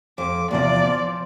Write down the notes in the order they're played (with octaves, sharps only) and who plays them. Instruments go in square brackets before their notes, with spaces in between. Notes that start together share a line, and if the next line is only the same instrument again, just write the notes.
[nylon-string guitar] F2 [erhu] D6
[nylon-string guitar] E2 C3 F3 [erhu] D5
[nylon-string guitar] F3